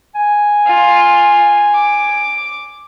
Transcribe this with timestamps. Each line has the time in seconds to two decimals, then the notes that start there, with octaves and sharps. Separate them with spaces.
0.15 G#5
0.66 F4
1.75 D6